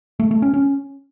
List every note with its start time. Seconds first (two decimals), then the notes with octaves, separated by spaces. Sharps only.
0.19 A3
0.31 A3
0.42 C#4
0.54 C#4